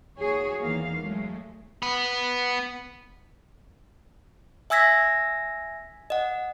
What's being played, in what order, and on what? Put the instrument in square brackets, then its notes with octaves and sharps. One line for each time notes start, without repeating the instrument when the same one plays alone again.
[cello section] D#2 F#4 G#4 C#5
E2 D#3 E3 A#3 F5
F#3 G#3 A3
[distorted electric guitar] B3 B5
[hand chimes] E5 G#5 E6 G#6 A#6 B6
D#5 F#5